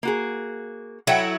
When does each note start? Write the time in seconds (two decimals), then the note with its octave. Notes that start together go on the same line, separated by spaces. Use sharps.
0.03 A#3 F#4 G#4
1.07 F#3 E4 F#4 A4 F#5 G5